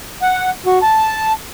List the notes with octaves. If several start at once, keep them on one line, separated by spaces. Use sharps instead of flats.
F#5
F#4
A5